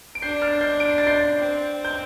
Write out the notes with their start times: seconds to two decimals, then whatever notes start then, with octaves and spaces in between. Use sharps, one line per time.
0.15 D7
0.22 D4 G6 C7
0.41 F6 A6
0.61 G6 C7
0.80 D7
0.89 C7
0.98 A6
1.07 G6 C7
1.38 C4
1.85 G6